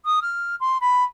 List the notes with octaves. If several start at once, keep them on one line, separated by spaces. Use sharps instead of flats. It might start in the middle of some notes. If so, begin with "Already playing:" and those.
D#6
F6
C6
B5